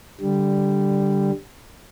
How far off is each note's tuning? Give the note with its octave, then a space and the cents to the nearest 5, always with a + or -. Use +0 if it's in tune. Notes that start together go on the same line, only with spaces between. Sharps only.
D3 -5 G3 +0